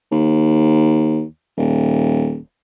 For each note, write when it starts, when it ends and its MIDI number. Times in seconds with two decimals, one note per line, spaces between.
0.12 1.23 39
1.58 2.38 27